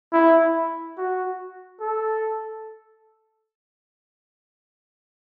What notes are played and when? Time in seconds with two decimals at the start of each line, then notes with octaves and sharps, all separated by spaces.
0.13 E4
0.98 F#4
1.81 A4